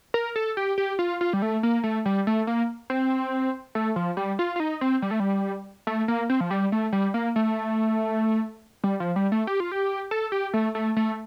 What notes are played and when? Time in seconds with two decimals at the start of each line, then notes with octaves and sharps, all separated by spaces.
0.14 A#4
0.36 A4
0.57 G4
0.78 G4
0.99 F4
1.21 F4
1.33 G3
1.42 A3
1.63 A#3
1.84 A3
2.06 G3
2.27 A3
2.47 A#3
2.90 C4
3.75 A3
3.96 F3
4.17 G3
4.39 F4
4.56 F4
4.60 D#4
4.81 C4
5.02 G3
5.11 A3
5.20 G3
5.87 A3
6.08 A#3
6.30 C4
6.40 F3
6.51 G3
6.72 A3
6.93 G3
7.14 A#3
7.36 A3
8.84 G3
9.00 F3
9.16 G3
9.32 A3
9.47 G4
9.60 F4
9.72 G4
10.11 A4
10.32 G4
10.54 A3
10.75 A3
10.96 A3